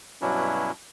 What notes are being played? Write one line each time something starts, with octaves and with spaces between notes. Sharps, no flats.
G2 B2 F#3 C#4 D4 E4